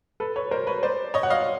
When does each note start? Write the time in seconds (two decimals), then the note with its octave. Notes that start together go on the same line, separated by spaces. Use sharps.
0.20 A4 B4
0.36 B4 C#5
0.51 A#4 C5
0.67 B4 C#5
0.83 C5 D5
1.14 C#5 D#5
1.23 F#5
1.30 D#5 F5